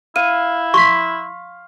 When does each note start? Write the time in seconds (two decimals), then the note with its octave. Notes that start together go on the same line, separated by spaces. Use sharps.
0.16 E4 F5 D#7
0.74 C6 C#6 B6